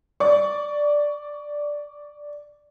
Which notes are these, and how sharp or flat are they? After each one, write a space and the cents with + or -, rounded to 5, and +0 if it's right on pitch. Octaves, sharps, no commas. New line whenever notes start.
D5 +0 C#6 +25